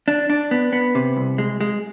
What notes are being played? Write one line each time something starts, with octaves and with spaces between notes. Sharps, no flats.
D4
D4
B3
B3
C3
C2
G#3
G#3